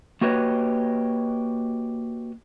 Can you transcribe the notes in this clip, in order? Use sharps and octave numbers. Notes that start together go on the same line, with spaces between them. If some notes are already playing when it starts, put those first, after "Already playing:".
A#3 F#4 G4 B4 C#5 D#5